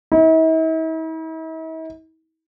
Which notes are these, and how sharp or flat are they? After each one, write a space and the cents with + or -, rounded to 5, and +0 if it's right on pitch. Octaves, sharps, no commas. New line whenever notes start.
E4 -45